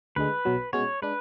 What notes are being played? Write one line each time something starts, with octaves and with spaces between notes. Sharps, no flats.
D2 D3 G#3 B4
B1 B2 F#3
B2 G#3 C#4 F#4 C#5
G#3 D4 B4